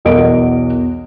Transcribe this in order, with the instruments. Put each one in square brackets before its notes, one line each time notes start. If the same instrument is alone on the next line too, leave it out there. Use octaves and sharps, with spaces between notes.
[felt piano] B1 E2 A#4 D#5 D7